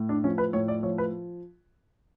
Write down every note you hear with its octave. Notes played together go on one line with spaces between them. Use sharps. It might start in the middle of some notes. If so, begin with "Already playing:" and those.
Already playing: A2
D4
F3 C#4
B4
A2 C#5
D5
F3 C#5
B4